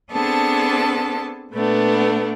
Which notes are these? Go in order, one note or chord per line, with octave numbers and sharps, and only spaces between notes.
B3 C4 D4 G#4 A4 A5
A#2 A3 B3 D4